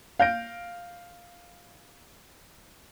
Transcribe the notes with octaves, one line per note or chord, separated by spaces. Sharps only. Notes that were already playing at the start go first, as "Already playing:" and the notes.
F5 G6 A#6 D7